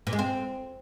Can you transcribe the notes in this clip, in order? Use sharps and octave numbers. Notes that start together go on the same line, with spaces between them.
A#2
G#3
C4